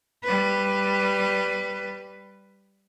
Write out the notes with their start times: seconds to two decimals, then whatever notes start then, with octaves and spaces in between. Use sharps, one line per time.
0.24 G3 B4